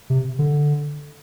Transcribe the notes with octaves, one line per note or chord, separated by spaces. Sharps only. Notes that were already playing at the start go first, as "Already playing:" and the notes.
C3
D3